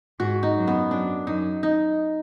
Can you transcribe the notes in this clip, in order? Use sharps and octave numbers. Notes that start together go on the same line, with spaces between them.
G#2 F#4
D#4
F#2
B3
F#2 D4
F#2 D#4
D#4